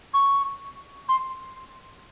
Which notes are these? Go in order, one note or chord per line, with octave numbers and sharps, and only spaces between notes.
C#6
C6